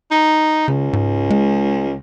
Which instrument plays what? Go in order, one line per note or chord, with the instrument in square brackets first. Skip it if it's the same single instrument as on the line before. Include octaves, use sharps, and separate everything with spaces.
[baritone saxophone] D#4
[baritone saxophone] C#2 [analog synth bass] C#3
[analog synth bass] G#2
G#3